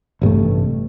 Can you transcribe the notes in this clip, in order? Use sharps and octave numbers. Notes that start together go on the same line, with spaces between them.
A1 G2 C3 A3